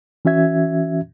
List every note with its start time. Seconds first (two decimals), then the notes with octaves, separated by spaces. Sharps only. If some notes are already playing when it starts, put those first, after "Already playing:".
0.25 E3 C#4 F#4 E5 G#6